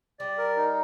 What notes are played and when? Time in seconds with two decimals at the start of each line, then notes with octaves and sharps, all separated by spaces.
0.19 G3 D5
0.38 A#4
0.57 D#4